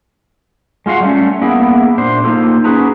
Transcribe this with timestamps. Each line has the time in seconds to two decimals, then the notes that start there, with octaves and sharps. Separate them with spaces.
0.86 G#3 F4 F#4 F5 F#5
1.01 G3 A3 C#4
1.42 A#3 B3 E4 G#4
1.98 A#2 D4 C5
2.24 A#3 D#4 F4 A4 C5
2.64 C#4 F#4 G#4 B4 A#5